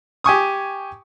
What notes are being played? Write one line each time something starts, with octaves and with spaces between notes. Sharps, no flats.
G4 G#5 C#6 D#6